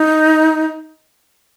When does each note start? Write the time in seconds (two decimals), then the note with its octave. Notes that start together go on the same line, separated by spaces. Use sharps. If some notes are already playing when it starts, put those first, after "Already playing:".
Already playing: D#4